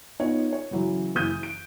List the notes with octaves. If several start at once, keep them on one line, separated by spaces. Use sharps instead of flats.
B3 D#4 F4 C#5
C#5
C#3 E3 F#3
F#1 E3 D#6 G6 D#7
D7